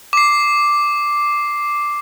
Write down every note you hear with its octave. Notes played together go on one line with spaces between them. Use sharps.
D6 C7